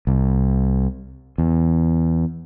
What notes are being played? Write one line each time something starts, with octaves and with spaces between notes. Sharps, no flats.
C2
E2